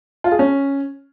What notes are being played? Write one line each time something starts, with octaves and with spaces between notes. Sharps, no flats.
F4
G#4
C#4